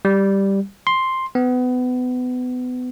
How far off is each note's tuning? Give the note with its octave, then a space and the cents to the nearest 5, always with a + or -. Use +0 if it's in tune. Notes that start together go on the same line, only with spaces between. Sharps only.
G3 +0
C6 +5
B3 +25